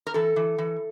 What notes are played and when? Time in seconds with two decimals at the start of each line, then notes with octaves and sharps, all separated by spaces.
0.07 A#4
0.14 E3 A4
0.36 E3
0.58 E3